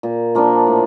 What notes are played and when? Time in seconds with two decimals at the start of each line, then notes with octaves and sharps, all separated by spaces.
0.03 A#2
0.35 F3 A#3 D4
0.67 A2